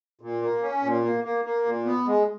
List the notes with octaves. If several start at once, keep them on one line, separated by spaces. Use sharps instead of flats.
A#2
A#3
C#4
A#2
A#3
A#3
A#3
A#2
B3
G#3